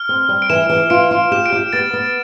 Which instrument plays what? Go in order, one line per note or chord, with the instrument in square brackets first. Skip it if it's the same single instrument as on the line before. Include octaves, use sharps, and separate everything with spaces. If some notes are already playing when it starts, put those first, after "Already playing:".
Already playing: [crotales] F6
[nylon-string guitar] C4
G3
[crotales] D7
[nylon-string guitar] E3 [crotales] E7
[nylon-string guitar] E3
[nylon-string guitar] F4 [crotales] D7
[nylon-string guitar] F4
[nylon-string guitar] G4 [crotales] E7
[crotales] D7
[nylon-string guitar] G4
[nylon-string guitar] B3 [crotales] A6
[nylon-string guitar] B3